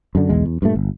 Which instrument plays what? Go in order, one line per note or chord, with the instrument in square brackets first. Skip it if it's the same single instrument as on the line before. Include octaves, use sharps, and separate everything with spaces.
[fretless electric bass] F#2 D3
B1 E2 G#3
E2
G2 A#2 A3
G1